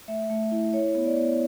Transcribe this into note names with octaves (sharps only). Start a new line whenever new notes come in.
A3 E5
A3
E4
E4 C#5
B3
D5
B3